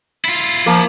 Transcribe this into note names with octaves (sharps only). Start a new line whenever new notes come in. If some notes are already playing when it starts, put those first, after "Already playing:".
E4 F4
F3 A#3